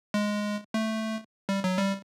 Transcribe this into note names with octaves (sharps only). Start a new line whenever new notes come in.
G#3
A3
G3
F#3
G3